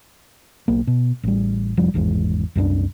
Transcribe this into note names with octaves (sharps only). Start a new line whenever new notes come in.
B1 A#3
B2
A1 G3
F1 F3 G3
G#1 E2 G#2
C2 F#2 E3 D4